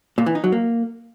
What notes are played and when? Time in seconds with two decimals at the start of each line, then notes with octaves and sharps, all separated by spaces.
0.18 A#2
0.26 E3
0.35 D#4
0.44 F#3
0.52 A#3